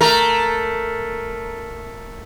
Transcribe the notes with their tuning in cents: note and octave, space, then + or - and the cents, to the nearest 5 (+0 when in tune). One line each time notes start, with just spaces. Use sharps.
A3 +0 A#4 +0